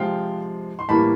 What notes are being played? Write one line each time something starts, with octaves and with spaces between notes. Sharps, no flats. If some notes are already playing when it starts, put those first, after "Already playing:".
Already playing: C3 F3 G#3 F5 G5
C6
A2 E3 G3 A#3 A5 B5